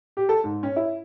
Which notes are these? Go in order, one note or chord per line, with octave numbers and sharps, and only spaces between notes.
G4
A4
G#2
C#4
E4